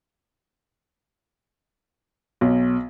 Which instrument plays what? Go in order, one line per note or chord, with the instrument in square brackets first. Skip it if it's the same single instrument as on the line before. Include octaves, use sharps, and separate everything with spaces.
[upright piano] B1